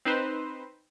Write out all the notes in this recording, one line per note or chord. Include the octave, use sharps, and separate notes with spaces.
C4 D#4 B4 C5